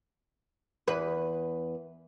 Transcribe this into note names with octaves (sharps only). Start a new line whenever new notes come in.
E2 B4